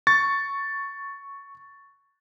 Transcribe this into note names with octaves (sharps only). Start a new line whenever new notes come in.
C#6 A6